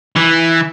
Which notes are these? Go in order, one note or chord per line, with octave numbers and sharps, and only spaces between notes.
E3